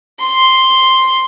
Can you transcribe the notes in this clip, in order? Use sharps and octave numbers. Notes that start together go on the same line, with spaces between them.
C6